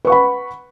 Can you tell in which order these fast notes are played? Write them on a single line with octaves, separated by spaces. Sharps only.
B4 C#6 F#5 B5